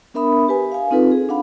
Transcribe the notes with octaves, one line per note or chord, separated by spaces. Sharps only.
B3 D4 A#4 E5 B5 D#6
G4 B4 G#5
F5 G#5
C4 D#4 F4 A4 B4
G#4
D4 F5 F#5 B5